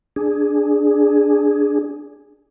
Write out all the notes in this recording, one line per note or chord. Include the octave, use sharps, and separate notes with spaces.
D4 G#4